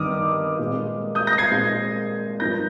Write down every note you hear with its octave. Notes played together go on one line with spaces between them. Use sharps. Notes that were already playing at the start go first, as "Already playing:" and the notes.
Already playing: G2 D#3 G3 D6 D#6 F6
A#2 G#3 C4
D#6 G6
G6 A#6
G#6 C7
A#2 G#3 C4
G2 F3 A#3 G6 A#6